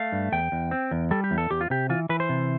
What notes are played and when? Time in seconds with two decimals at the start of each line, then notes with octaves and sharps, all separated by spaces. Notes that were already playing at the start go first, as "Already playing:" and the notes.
Already playing: A3 F5
0.12 G2
0.32 E2 G5
0.52 E2
0.71 C4
0.91 E2
1.11 G3 A4
1.24 G4
1.31 E2
1.38 A4
1.51 E2 G4
1.61 F4
1.70 C3 G4
1.90 E3 F4
2.09 E3 B4
2.20 C5
2.29 C3